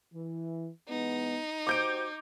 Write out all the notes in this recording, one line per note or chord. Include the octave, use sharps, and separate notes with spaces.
E3
E3 G#3 B3 D#4
F#4 G4 C5 D6 G6 D7